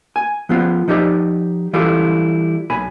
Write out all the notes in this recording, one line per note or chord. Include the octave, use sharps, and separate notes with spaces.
G#5
F3 B3 F4
F3 D#4 G4 D5 D#5
E3 G3 E4 F4 G4 A4
B1 G#5 B5